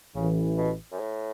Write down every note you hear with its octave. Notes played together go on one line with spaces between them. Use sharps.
A1 A2 C#3 E3
B2
F#2
A2